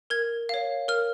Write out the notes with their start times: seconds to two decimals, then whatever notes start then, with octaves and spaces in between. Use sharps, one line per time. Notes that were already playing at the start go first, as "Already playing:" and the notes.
0.10 A#4 G#6
0.49 C#5 F5
0.88 A#4 F6